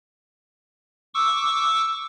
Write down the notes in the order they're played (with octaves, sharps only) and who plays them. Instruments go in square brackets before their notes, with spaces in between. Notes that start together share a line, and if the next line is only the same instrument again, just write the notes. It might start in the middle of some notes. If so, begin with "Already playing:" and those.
[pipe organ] C#6 D6 E6